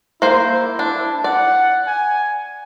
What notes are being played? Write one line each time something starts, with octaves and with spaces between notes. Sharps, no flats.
A#3 E4 C5
D4
D5 F#5
G#5